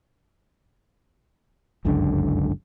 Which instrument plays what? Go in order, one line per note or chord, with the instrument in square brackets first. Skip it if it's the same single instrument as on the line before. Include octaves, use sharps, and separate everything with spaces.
[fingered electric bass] G1 C#2 F#2 D3